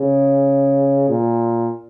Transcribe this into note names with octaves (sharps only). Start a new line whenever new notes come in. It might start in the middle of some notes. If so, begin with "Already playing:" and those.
Already playing: C#3
A#2